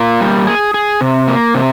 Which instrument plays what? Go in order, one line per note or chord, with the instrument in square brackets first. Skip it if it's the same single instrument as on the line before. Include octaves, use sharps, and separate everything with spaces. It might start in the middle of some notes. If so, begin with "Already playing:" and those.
Already playing: [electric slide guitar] A#3 F4
G3
G#4
G#4
C3
A#3
C3